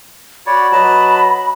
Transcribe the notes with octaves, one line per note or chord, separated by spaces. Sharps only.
F#4 C#5 D5 B5
F#3 B4 D#5 A5